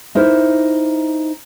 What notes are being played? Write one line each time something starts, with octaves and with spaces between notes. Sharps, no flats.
D#4 E4 A#4 C5